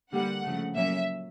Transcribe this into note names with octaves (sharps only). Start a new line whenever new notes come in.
D3 G3 A#3 F#5
C#3 F3 A3
A#2 F#3 A#3 C#4 E5